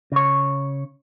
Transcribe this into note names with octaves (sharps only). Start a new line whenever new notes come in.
C#3 C#5